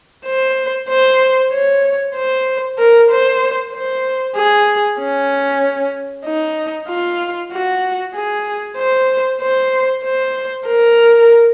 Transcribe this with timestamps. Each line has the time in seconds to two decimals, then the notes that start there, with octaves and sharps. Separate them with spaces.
0.26 C5
0.89 C5
1.52 C#5
2.15 C5
2.79 A#4
3.10 C5
3.73 C5
4.36 G#4
5.00 C#4
6.26 D#4
6.89 F4
7.52 F#4
8.15 G#4
8.78 C5
9.42 C5
10.05 C5
10.68 A#4